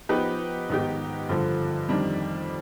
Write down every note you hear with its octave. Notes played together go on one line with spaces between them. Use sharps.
F3 B3 D#4 G4 B4
G#2 D#3 B3 D#4 G4
G2 D3 F3
F2 D#3 G3 D4